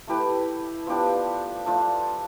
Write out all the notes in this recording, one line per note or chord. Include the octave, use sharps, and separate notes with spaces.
A3 E4 G4 B4
F3 B3 D4 G4
F3 A3 D4